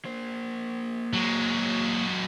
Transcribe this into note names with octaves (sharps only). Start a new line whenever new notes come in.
A#3 C5
F#3 G#3